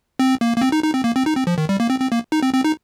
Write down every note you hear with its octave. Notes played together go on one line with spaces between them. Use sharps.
C4
A#3
A#3
C4
D#4
D#4
C4
A#3
C4
D#4
C4
F3
D#3
G3
A#3
C4
C4
A#3
D#4
C4
C4
D#4